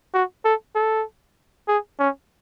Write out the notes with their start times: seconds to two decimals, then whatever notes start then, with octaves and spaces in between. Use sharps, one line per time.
0.14 F#4
0.45 A4
0.75 A4
1.68 G#4
1.99 C#4